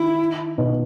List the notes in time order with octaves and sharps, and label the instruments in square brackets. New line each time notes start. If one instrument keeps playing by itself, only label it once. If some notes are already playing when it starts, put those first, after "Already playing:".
Already playing: [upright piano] D#3 [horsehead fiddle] E4
[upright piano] B2